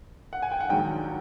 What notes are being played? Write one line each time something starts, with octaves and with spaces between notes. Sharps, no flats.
F#5
G#5
G5
F#5
A#1 G#2 D#3 F#3 G5